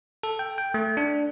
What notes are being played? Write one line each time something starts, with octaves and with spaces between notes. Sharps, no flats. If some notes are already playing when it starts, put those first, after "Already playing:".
A4
G5
G5
A3
D4